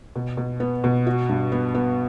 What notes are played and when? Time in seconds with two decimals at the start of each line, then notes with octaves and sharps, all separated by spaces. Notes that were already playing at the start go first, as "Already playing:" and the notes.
0.16 B2
0.37 B2
0.60 B3
0.84 B2
1.07 F#4
1.29 G2
1.52 B3
1.75 B3